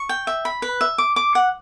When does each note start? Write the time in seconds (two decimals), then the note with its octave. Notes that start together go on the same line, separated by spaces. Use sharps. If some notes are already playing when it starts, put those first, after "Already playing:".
Already playing: C#6
0.09 G5
0.27 E5
0.45 B5
0.62 B4
0.81 E5
0.98 D6
1.16 D6
1.35 F#5